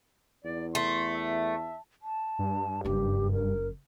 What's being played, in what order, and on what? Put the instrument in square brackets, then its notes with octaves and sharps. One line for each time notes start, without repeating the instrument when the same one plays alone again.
[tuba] E2 [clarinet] D5
[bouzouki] A3 [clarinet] C6
[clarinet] E5
[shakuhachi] A5
[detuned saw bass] G2
[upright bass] F#1 F#2 [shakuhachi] G4
[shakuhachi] A#4